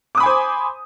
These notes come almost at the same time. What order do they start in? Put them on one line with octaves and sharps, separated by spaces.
D6 D#6 B5 G#5 C5